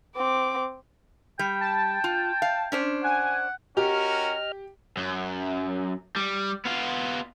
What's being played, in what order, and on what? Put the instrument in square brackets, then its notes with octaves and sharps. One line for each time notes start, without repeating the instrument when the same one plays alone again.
[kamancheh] C4 D6
[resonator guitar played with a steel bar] G3 [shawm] G5
[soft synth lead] A5
[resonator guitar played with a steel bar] F4
F5
C#4 D4 C5
[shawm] F#5 [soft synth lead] G#5
[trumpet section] C#4 F#4 A#4 [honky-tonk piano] G4 [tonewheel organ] D#5 F6
[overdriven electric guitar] F#2
G3
B3 F4